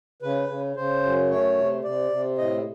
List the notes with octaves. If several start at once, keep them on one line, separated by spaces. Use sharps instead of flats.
C#3 B4
C#3
C#3 C5
F#2
A3 C#5
C3
C3 D5
C3
A2 D#5